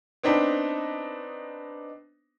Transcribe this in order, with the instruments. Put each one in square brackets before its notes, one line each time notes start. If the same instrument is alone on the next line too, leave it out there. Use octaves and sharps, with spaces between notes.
[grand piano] B3 C4 D4 D#4